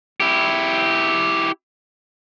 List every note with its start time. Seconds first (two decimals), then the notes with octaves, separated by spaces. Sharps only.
0.20 E4 G4